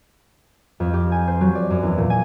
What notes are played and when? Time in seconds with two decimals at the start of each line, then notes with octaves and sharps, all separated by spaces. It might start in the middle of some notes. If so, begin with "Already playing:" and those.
0.80 F2
0.94 G4
1.12 G#5
1.27 C5
1.41 F#3
1.55 D5
1.70 F#2
1.83 E2
1.98 A#2
2.10 G#5